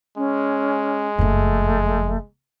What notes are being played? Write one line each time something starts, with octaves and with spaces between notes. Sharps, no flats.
G#3 C#4
F#1 F2 A3